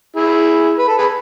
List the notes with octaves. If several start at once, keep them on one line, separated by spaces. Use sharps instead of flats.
E4 G#4
B4
A4
G#4 B4